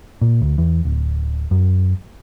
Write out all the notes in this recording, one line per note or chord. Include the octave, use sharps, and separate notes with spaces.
A#2
D2
E2
D1
F#2